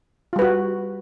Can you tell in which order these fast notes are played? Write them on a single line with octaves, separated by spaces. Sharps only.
F4 G3 B4 F#4